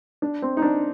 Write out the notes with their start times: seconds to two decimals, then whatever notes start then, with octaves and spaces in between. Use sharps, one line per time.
0.22 D4
0.42 C4
0.57 D#4
0.62 D4